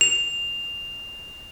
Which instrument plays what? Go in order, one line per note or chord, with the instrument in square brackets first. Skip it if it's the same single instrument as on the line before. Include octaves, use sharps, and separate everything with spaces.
[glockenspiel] F7